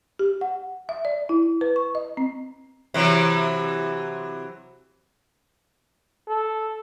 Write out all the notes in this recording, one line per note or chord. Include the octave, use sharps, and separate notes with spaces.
G4
F#5
E5
D5
E4
B4
C#6
D#5
C4
C3 E3 F#3
A4